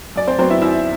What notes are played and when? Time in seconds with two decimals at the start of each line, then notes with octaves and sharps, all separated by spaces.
0.16 F#2 D5
0.27 C4 C5
0.38 F#3 C4 C5
0.42 B3
0.50 E4 E5
0.62 F#2 E4 E5